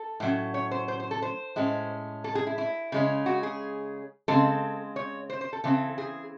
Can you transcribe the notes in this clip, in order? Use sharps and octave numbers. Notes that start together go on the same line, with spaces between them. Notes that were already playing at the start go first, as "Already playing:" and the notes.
Already playing: A4
A2 F#3 C#4
C#5
C5
C5
C5
A4
C5
A2 G#3 C#4
A4
G#4
E4
E4
C#3 G#3 C#4
F#4
G#4
C#3 G#3 C4 A4
C#5
C5
C5
A4
C#3 E3 C4 A4
G#4